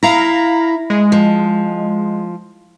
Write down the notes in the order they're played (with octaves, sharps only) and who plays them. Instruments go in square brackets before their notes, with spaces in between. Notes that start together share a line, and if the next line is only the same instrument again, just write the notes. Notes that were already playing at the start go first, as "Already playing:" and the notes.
[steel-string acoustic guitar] E4 [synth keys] F5 A#5 A#6
[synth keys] G#3
[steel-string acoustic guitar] F3